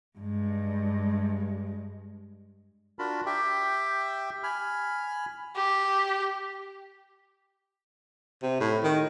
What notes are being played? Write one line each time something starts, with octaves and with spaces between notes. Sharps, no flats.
G2 G#3
D4 F4 F#4 A#4 A5 B5
G4 E5 G5
G#5 B5 F6
G4
C3
A2
D#3